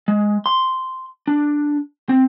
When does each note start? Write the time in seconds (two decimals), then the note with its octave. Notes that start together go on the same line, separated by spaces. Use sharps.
0.08 G#3
0.46 C6
1.28 D4
2.09 C4